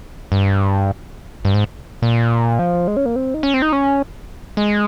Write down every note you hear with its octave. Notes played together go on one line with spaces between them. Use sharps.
G2
G2
G#2
A#2
F3
G#3
C#4
A#3
C4
D#4
C#4
C4
D#4
C#4
G#3